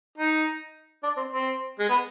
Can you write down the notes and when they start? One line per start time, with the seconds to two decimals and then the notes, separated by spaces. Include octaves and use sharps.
0.18 D#4
1.04 D4
1.17 C4
1.33 C4
1.80 G#3
1.89 B3